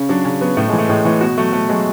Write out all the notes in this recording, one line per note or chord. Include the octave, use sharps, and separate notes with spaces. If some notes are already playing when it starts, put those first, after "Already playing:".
Already playing: C#3 C#4
F#3 D4
C#3 C#4
F#3 B3
A2 A3
G#3
E3
A3
A2 G#3
E3 A3
B2 F#4
F#3 A3
B2 A3
F#3 G#3